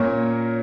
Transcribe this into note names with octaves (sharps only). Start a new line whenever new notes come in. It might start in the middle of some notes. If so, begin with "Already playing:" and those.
Already playing: A#2 A#3 C#4 A#4 C#5